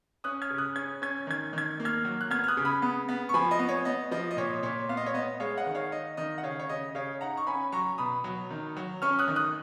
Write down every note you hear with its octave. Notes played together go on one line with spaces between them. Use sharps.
C#4 D#6 F#6
F6 G#6
C#3
D#6 F#6
C#4 G#6
C#4 G#6
D#3 G#6
D#3 G#6
A#3
F6 G#6
F#3
F#6
B3 F6 G#6
F6
D#6 F#6
C#3
B5 D#6
B3
B3
C#6
F3 G#5 B5
D#5
B3
C#5
B3 D#5
F3 D#5
D#5
A#2 C#5
A#2 C#5
B3 F5
D#5
C#5
B3 D#5
G#3 C#5 F5
D#5 F#5
D#3
C#5 F5
D#4 D#5
D#3 D#5
F#5
C#3 C#5 F5
C#5
C#3 D#5
C#3 C#5 F5
D#4 F#5 A#5
C#6
C#4 G#5 B5
F#3 A#5 C#6
B2 B5 D#6
F#3
D#3
F#3
C#4 C#6 F6
D#6 F#6
D#3
D#6 F#6